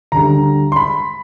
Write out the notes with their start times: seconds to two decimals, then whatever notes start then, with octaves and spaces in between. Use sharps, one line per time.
0.12 D2 D3 G3 A#5
0.72 C6
0.76 B5